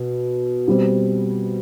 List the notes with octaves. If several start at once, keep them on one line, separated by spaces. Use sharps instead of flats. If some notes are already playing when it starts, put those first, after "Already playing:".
Already playing: B2
B2 G3 C4